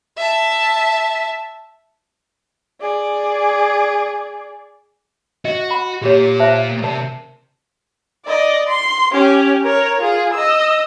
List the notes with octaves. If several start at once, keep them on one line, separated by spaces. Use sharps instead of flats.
E5 A5
G#4 D5
F#4 D#5
F#5 B5
A#2 G4 G#4 C#5
C5 E5 A5
C3 A#4 D5 A5
D5 D#5
C6
C#4 G4
A#4 C#5
F4 G#4
D#5 E6